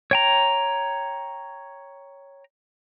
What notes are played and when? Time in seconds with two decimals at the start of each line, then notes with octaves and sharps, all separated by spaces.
0.11 C#5 G5 A#5